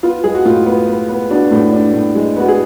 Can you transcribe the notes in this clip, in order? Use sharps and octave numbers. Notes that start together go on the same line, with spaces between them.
B3 F4
G#3 G#4
F#4
A2 F4
B3
B3
B3
B3 D4 F#4
A2
D4
A2
G#3
B3 F#4
G#4